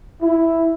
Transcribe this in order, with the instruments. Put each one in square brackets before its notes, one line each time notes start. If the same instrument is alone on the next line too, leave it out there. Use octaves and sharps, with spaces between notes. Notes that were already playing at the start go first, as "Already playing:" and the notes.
[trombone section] E4